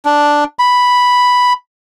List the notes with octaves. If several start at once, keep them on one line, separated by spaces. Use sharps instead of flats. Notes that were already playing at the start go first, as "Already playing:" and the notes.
D4
B5